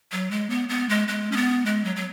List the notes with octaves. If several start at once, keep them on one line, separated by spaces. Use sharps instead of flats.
F#3
G#3
B3
B3
G#3
G#3
C#4
B3
G#3
F#3
F#3